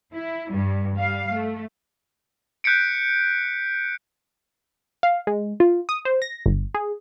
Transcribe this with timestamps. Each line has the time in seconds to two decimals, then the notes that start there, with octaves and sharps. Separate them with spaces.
0.14 E4
0.51 G2 G3
0.96 G3 F5
1.32 A3
2.64 F#6 G6 B6 C#7 D7
5.03 F5
5.27 G#3
5.60 F4
5.89 D#6
6.05 C5
6.22 A#6
6.46 G1
6.74 G#4